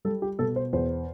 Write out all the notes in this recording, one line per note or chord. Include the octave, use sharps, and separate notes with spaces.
G3 A4
G4
B2 A4
C5
E2 C5